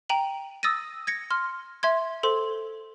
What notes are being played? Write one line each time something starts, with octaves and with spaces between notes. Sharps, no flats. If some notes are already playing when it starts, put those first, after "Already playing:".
G5 A#5 D#7 F#7
D#6 E6 A6 A#6 D#7
G#6 A#6 C#7
C6 F6
E5 C6 G#6
A4 C5 C6